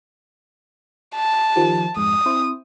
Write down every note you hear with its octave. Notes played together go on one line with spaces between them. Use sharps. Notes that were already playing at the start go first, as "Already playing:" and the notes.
A5
D#3 F3 G4
F2 G#2 D#6
C4 E4 C5